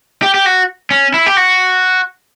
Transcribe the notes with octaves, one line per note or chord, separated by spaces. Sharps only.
G4
G4
F#4
C#4
E4
G4
F#4